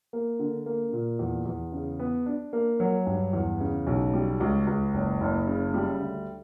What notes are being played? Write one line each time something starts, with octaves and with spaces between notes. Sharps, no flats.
A#3
D3
A#3
A#2
E2
E2
C#3
B3
D4
A#3
F#3
G2
E2
C#3
B1
G3
C#2
C#2
F#1
F#1
C#3
G3
D2